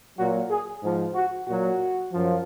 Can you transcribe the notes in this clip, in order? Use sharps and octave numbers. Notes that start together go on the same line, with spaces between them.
A#2 F#3 F#4
G#4
G#2 F3
F#4
A#2 F#3 F#4
F#2 F3